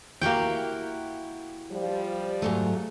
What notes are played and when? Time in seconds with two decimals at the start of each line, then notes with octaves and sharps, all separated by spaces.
0.21 A#3 E4 F#4 G4 G5
1.71 F3 G3
2.42 G#2 F#3 A3